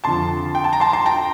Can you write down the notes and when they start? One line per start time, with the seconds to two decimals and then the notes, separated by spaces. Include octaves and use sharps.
0.04 F2 D3 F3 A5 C6
0.55 G5
0.64 A5
0.73 A#5
0.80 A5 C6
0.93 A5 C6
1.06 G5 A#5